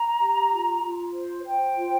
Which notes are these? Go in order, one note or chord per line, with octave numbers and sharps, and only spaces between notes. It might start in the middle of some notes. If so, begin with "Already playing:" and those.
Already playing: A#5
G4
F4
F4
C5
C5 G5
F4